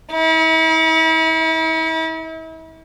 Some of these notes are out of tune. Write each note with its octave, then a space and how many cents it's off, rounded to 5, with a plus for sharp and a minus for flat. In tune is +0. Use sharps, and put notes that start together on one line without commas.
E4 -40